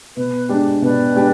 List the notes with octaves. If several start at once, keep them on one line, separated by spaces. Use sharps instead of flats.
B2 B4
G#3 D4 G4
B2 B4 D5
G#3 D4 G4